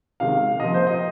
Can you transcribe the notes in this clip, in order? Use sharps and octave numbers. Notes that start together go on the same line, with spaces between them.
C3 D#3 G#3 F5
C3 F3 A#3 D#5
C5
D#5